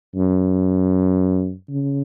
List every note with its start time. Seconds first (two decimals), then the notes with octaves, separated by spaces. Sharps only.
0.15 F#2
1.69 C#3